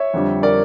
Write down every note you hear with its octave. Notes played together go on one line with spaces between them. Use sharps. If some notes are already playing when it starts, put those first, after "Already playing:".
Already playing: C#5 E5
F2 D3 G3
A#4 D5